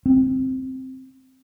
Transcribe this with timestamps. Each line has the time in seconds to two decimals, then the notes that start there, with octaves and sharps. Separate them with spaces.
0.06 C4